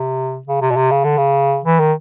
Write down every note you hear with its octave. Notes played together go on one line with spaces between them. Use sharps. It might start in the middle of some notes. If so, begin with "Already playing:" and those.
Already playing: C3
C#3
C3
B2
C3
C#3
D3
C#3
E3
D#3